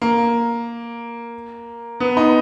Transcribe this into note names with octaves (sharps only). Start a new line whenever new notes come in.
A#3
B3
D#4